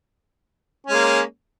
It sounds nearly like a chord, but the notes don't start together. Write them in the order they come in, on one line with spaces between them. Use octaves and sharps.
C#4 G#3 A#3